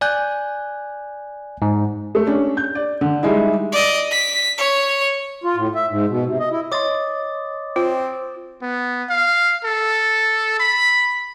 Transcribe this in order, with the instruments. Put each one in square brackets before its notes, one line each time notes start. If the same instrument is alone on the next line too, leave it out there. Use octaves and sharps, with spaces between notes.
[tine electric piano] D5 G#5 F#6 G6
G#2
[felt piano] A3
C#4 D4
G6
D5
D3
G3 G#3 D#4 E4
[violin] D5 D#5
B6
C#5
[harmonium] F4
A2
E5
G#2
B2
C3
D#5
E4
[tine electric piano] C#5 D#5 C6 [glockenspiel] D6 D#6 A6
[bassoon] C4 [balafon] F4
[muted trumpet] B3
F5
A4
B5